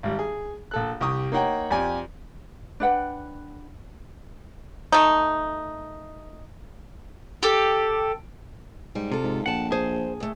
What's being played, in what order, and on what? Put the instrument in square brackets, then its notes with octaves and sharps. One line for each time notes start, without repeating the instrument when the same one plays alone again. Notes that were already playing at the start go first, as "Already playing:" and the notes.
[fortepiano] G#1 G3
G#4
A#1 A4 F#6
C2 G4 C#6 D#6
A#3 D#4 C#5 F#5 G5
F2 G4 D5 G#5
[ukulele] D4 B4 F#5 G5
[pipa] A3 D#4
[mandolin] G4 A4
[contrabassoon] G#2 [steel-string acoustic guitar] G3
[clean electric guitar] C3 [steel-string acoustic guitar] F4 A4
[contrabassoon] G#2
[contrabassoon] A#1 [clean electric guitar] F#5 [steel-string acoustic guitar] G5 A5
[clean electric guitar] G#4 [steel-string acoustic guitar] C5
[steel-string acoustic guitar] D#2 A3